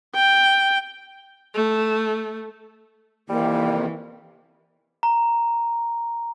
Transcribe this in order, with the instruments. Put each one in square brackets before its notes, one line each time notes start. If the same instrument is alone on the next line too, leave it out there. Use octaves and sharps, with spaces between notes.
[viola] G5
A3
[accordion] F2 C3 D#3 [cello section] E3 [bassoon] G3 [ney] A#3
[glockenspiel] A#5